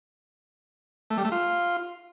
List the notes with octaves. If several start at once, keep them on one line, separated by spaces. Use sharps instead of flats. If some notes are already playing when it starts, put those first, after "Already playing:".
A3
G3
A3
F4